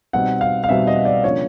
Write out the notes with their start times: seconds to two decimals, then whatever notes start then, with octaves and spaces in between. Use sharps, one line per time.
0.13 B2 G3 C4 D#4 F#5
0.41 F5
0.64 F5
0.69 B2 G3 C4 D#4 E5
0.87 D#5
1.05 D5
1.24 C#3 F3 A#3 D4 C#5